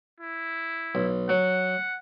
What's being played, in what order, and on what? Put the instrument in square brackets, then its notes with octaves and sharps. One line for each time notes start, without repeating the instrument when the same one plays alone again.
[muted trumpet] E4
[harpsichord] B1
[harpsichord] F#3 [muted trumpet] F#5